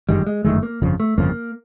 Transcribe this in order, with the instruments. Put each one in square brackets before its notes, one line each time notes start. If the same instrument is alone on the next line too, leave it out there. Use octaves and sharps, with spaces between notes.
[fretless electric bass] G1 F#2 D#3 G#3 [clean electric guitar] G3
[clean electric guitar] G#3
[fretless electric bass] G1 F#2 D#3 G#3 [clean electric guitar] A3
[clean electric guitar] A#3
[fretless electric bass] G1 F2 C#3 F3
[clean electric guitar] A3
[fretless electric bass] G1 F2 C#3 F3 [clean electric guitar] A#3